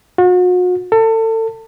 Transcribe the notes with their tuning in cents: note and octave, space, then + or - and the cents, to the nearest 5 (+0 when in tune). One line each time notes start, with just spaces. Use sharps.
F#4 -40
A4 +30